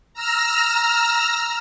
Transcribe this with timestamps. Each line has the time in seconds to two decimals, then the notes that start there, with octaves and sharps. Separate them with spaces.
0.13 A#5 E6 F6 A#6